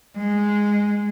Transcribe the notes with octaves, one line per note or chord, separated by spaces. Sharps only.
G#3